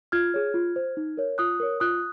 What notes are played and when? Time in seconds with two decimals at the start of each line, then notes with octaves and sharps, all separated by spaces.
0.12 F4 F6 G#6
0.34 G#4 C#5
0.54 F4
0.76 C5
0.97 D#4
1.17 A#4 C#5
1.38 F4 D#6 F#6
1.60 A#4 C#5
1.80 F4 D#6 F#6